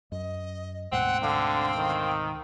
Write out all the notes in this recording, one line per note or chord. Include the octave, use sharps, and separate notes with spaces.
F#2 D#5
D2 G#2 B2 C4 F#5
D3 F5
D#3